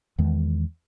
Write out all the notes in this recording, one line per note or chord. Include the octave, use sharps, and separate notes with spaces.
E2 D#3 G#3